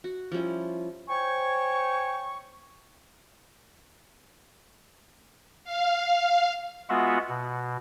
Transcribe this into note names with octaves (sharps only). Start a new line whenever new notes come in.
F#4
F3 G3 C#4 E4
C5 C#5 G5 G#5 C#6
F5
G#3 B3 F4 F#4 E5 F#5
B2